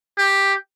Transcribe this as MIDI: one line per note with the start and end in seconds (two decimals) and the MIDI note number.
0.18 0.54 67